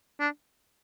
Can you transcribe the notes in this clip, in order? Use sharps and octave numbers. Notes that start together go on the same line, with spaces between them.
D4